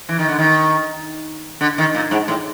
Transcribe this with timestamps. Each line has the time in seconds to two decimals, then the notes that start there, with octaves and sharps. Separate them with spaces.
0.09 E3
0.19 D#3
0.29 D3
0.39 D#3
1.61 D3
1.78 D#3
1.95 A#2
2.11 G#2
2.28 A2